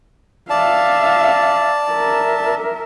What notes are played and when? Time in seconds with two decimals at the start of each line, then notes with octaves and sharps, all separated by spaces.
0.50 D5 E5 F5 A5
1.91 A#4 E5